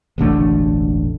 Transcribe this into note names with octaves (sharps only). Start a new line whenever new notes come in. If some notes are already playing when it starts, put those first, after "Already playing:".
E1 A1 D3 A3